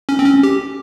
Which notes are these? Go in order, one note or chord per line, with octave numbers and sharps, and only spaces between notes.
C#4
C4
C#4
G4